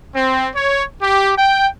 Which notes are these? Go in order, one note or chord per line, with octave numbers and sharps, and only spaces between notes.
C4
C#5
G4
G5